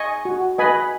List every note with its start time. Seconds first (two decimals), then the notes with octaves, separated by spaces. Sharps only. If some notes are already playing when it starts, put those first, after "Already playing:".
Already playing: D#5 G#5 C#6
0.25 F#4
0.58 B4 D#5 G#5 B5